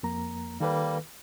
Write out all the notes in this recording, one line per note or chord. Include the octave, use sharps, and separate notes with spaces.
F2 A#3 A#5
D#3 G3 A#3 A4 B4